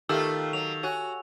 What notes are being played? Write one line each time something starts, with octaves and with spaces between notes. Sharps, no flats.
D#3 A3 F4 G4 A4 A5 E6 F6
F#3 F7
F#4 C#5 G#5 F#6